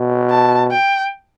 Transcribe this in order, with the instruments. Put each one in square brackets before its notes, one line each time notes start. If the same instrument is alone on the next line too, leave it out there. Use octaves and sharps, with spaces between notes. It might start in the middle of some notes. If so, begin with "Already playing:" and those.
Already playing: [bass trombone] B2
[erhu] A5
G5